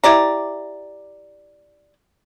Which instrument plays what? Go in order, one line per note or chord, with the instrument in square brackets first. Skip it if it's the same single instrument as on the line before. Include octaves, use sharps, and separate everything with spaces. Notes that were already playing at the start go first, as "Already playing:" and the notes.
[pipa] E4 G4 D5 A#5